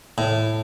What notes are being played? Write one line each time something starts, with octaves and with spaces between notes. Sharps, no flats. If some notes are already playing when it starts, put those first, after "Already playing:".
A2